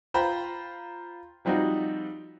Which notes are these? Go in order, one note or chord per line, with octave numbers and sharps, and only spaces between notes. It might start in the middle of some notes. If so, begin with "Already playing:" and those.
F4 C5 G5 A#5 B5
F3 G3 C4 D#4 F#4